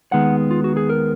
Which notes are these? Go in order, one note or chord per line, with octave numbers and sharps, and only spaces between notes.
D#2 D#3 G#3 B3 F#5
F4
F#4
G#4
A#4